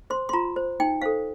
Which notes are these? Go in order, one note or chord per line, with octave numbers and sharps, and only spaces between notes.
C5 C6
C6
F4 A#5
C5
D#4 G5
A4 C5 F5